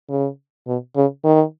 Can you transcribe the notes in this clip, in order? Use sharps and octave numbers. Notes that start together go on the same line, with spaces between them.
C#3
B2
C#3
D#3